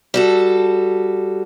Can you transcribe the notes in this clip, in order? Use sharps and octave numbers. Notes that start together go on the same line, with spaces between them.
G3 F#4 A4